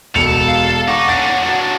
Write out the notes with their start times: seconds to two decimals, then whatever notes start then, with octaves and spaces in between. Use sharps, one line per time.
0.15 E1 A4 C#7 F7
0.48 F5
0.88 D#4 F#5 C#6 D6
1.09 C#4 D4 A6
1.26 A#3 C#5
1.43 F#3 D4